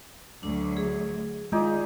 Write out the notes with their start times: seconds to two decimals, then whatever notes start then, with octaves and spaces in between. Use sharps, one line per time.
0.43 D2 F#3 D4
0.77 G#4
1.52 D#3 G#3 D#4 F4 G#4 D5